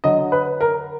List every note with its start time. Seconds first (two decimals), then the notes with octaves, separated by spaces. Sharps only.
0.04 D3 F#3 D#5
0.32 B4
0.61 A#4